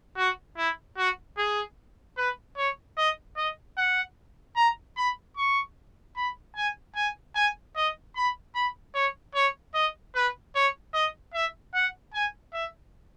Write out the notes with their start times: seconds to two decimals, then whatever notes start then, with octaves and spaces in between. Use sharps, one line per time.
0.17 F#4
0.57 E4
0.97 F#4
1.37 G#4
2.17 B4
2.57 C#5
2.98 D#5
3.37 D#5
3.77 F#5
4.56 A#5
4.97 B5
5.37 C#6
6.16 B5
6.56 G#5
6.96 G#5
7.35 G#5
7.76 D#5
8.16 B5
8.55 B5
8.95 C#5
9.35 C#5
9.74 D#5
10.15 B4
10.55 C#5
10.94 D#5
11.34 E5
11.74 F#5
12.14 G#5
12.53 E5